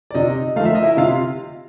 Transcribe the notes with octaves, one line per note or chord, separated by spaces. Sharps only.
D5
C3 D#4 D#5
F3 A3 F5
E5
D#5
E4 E5
C3 F4 F5